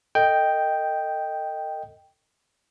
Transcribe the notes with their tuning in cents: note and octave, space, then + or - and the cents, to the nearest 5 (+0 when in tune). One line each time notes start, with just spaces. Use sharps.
A4 +40 D#5 +0 G5 +0